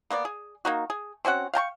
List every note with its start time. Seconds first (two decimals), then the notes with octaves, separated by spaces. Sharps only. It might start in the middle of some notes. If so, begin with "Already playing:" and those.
0.10 A#3 B3 C#5 D5
0.25 G#4
0.65 A#3 D#4 F#4
0.90 G#4
1.25 C4 C#4 F#4 F#5
1.54 F5 G5 A5 C#6